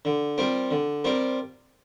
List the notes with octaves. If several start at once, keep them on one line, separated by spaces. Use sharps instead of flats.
D3
G3 C4 F4 A#4
D3
G3 C4 F4 A#4